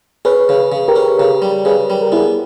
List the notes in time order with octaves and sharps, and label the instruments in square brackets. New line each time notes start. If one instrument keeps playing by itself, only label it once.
[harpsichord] C#4 [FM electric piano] G#4 B4
[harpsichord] C#3
C#3
[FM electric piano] G4 A#4
[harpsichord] C#4
[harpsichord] C#3 [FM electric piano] G4 A#4
[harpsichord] G3
[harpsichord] C#3 [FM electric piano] G#4 B4
[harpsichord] G3
[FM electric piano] A#4
[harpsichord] B3 [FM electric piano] E4 G#4